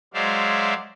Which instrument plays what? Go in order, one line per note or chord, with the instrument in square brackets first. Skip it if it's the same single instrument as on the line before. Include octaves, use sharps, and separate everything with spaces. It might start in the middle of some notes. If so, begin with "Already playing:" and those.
[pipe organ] F#3 G#3 C5 D5 E5 F5